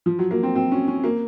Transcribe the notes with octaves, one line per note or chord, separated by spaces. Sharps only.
F3
F#3
A#3
C4
C4
C#4
C#4
A#3